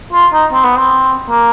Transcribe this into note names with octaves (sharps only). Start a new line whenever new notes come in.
F4
D#4
C4
B3
C4
A#3